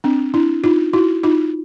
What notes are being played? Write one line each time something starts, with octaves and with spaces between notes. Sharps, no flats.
C4 D4
D4 E4
D#4 F4
E4 F#4
D#4 F4